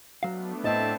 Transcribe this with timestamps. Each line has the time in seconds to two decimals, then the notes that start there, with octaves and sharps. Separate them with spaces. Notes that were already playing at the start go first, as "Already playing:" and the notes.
0.23 F#3 A3 B3 D4 F5
0.64 A2 C4 D#5 E5 A5